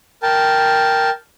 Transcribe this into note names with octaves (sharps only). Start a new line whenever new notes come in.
A#4 G5 A5